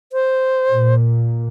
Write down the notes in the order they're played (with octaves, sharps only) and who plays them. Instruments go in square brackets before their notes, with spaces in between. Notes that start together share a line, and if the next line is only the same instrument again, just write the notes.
[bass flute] C5
[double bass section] A#2